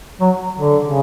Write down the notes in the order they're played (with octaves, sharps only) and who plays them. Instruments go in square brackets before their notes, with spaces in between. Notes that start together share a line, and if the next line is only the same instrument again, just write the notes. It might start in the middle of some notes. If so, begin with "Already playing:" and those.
[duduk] F#3
D3
C#3